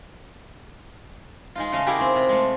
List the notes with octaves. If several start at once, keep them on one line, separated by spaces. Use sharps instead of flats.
G#3 D#4 F4
C#3 A3 D#5 F5
C#4 E4 F4 G4 G#4 A#4
C4
C3
G#3 A3